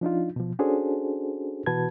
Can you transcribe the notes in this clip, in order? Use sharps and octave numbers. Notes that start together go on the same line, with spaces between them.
F3 D4 D#4 F4
B2 F3
C#4 D4 F#4 G#4 A4 C5
B2 E3 F#4 B4 A5 G#6